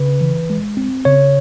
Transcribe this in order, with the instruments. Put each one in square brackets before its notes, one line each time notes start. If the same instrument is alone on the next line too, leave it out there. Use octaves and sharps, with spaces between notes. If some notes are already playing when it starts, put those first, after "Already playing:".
Already playing: [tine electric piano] C#3 B4
E3
G#3
C4
C#3 C#5